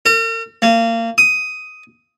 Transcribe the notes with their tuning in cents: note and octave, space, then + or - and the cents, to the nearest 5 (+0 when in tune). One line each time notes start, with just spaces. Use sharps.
A#4 -45
A#3 -30
D#6 +10